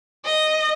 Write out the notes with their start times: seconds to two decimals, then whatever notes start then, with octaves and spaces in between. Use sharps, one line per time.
0.25 D#5